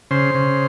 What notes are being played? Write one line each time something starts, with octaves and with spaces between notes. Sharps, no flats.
C#3 C5
C#3